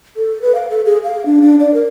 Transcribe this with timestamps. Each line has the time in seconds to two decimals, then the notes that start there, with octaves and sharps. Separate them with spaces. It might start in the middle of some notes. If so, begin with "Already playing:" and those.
0.17 A4
0.42 B4
0.55 F5
0.70 A4
0.85 G#4
1.04 F5
1.26 D4
1.41 D4
1.60 D5
1.74 A#4